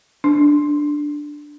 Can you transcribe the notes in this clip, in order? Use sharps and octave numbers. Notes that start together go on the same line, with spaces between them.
D4